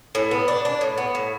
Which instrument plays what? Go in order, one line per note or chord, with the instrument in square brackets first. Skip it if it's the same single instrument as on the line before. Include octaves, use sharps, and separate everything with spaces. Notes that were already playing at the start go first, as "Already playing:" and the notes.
[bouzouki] A2
B3
D4
D4
A2
B3
A2